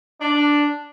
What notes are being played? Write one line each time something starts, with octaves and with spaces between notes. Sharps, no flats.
D4